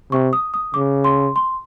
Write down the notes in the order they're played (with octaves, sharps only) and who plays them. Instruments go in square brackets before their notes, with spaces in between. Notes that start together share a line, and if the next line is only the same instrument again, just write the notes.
[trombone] C3 [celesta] C#6
[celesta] D#6
D#6
[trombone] C#3 [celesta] D6
[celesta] C6
C6